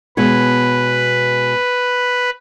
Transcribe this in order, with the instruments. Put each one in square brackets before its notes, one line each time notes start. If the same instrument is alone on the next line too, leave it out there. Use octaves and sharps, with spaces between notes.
[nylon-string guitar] B2 G#3 C#5 [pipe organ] B4